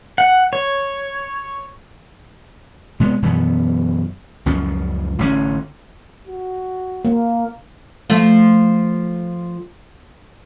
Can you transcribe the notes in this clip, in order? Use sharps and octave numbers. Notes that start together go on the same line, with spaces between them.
F#5
C#5
C3 G#3 B3
F#2 B2 E3 B3
C#2 F#2 C#3 F3
A1 D3 E3 C#4
F#4
A#3
F3 A3